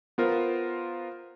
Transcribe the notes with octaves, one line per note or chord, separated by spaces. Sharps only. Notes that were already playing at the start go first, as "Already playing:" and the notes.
B3 F4 A#4 C5